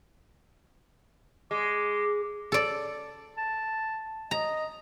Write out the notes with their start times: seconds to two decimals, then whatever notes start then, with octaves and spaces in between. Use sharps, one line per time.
1.51 G#3 D6
2.52 A4 D5
3.38 A5
4.31 D#5 A#5